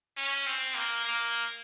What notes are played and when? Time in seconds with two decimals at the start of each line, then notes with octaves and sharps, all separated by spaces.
0.17 C#4
0.47 C4
0.75 A#3
1.04 A#3